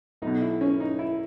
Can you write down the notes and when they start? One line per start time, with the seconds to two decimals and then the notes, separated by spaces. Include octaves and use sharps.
0.22 B1 B2 D#4
0.41 E4
0.61 C#4
0.80 D#4
0.99 E4